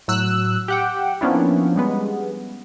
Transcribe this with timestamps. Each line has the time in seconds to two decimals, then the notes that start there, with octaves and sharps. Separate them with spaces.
0.08 A2 F#3 E6 F#6
0.68 G4 F#5 G5
1.21 F3 A#3 B3 C#4 D4 E4
1.76 G3 G#3 B3